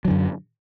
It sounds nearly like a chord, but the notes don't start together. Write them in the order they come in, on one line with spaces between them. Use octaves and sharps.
F#3 D3 F#2